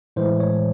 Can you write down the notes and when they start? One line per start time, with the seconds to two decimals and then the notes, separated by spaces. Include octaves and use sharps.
0.16 A2 E3 G#3 C5
0.40 C#5